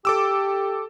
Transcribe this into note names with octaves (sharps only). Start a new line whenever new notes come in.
G4 A4 D6 E6